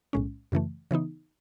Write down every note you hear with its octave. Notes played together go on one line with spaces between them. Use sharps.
B1 A2 G#3 C#4
F#2 C#3 E3 A3
C#3 E3 B3 D#4